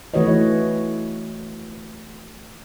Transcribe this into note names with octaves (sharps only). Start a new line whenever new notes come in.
E3 A3 F#4 B4 C#5 D#5